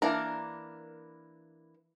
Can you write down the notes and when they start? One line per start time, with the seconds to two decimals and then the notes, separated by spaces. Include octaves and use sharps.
0.02 E3 A#3 D4 A#4